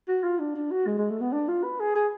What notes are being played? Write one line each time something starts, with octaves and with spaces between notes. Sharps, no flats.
F#4
F4
D4
D4
F#4
G#3
G#3
A3
B3
D4
F4
B4
G#4
G#4